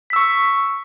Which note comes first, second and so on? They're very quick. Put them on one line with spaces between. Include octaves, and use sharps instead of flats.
B6 E6 C#6